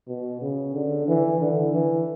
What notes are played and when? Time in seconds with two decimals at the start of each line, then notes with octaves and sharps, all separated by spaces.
0.08 B2
0.41 C#3
0.74 D3
1.08 E3
1.41 D3
1.74 E3